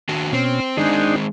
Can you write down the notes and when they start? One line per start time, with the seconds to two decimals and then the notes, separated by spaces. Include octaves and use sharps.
0.09 D#3 D4 F#4
0.33 B2 C4 C#4 C5
0.77 D#3 G#3 C4 D4 D#4 G#4